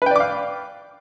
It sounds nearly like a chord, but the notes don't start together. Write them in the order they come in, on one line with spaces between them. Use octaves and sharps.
B4 G5 D5 D6 F5